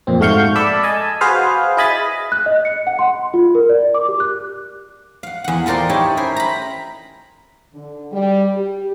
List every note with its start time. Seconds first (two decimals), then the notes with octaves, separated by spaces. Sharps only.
0.07 F2 A#2 C4
0.20 G#2 A3 F#4 F5 C#6 G6
0.56 A4 D5 A5 B5 E6
0.83 D#5 G#5 A5
1.21 F#4 G#4 B4 C5 F5
1.77 E4 G#4 D#5 G#5 B5 A6
2.32 F#6
2.46 D#5
2.65 C#7
2.87 F#5
2.99 C6
3.34 F4
3.55 A#4
3.69 D5
3.94 D6
4.09 G4
4.20 F#6
5.23 F5 F#5
5.44 E2 F#5
5.66 F4 A4 A#4 C5 D5 G5
5.89 D#4 E4 G4 A4 A#4 C#5
6.17 C#4 E4 A#4 C5
6.36 A#5 B5
7.74 D3
8.12 G3
8.57 G4